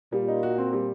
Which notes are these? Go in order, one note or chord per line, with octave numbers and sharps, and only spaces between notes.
A#2 G3
D#4
F#4
C4
G3